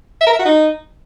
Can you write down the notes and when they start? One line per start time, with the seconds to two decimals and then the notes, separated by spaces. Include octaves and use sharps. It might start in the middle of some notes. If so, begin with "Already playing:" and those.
0.21 E5
0.27 A#4
0.33 E5
0.39 F#4
0.45 D#4